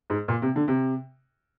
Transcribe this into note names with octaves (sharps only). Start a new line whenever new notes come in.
G#2
A#2
C3
D3
C3